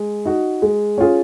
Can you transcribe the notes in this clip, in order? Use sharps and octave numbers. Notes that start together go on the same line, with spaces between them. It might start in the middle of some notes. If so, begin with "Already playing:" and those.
Already playing: G#3
D#4 F#4
G#3
C#4 F4 G#4